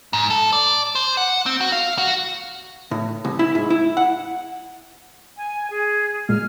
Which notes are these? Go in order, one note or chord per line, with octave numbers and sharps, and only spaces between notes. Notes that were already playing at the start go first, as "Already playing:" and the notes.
G#2
A4
D5
C5
F#5
C4
F#4
F5
F#4
A2
C2
E4
G#2
E4
F#5
G#5
G#4
A#2 G#3 F6